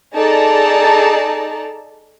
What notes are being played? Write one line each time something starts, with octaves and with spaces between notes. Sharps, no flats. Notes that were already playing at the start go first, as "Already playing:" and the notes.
D#4 G#4 A4 D5 A5 A#5